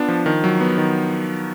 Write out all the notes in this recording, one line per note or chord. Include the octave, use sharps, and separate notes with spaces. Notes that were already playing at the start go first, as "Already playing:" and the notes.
Already playing: B3 D4 F4
F3
D#3
F#3
B3
D#3